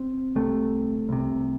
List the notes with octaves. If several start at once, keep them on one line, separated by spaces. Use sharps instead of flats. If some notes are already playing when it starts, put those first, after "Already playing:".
Already playing: C4
C2 C3 A3
C2 C3